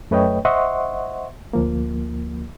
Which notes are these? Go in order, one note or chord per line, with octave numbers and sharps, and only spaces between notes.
F#2 A3 B4 C#5 D#5 G5
C5 D#5 E5 F#5 C6 C#6
D2 F3 A#3